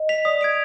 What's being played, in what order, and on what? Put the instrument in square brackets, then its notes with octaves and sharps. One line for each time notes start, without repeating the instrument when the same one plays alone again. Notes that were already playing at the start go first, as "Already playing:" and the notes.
Already playing: [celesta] D#5
[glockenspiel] B6 F7
[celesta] D5 [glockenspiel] D#6
[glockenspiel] G#6 D7 F7